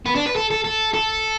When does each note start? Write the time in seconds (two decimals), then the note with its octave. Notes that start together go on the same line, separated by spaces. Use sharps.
0.06 B3
0.16 D4
0.26 B4
0.36 A4
0.51 A4
0.65 A4
0.94 A4